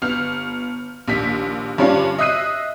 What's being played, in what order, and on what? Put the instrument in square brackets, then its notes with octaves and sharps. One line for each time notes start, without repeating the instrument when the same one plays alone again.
[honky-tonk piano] G1 F6
A#1 D#2 B6
G2 D3 C#4 D4 F4
D#5 E5 D#6 F#6 C7 D#7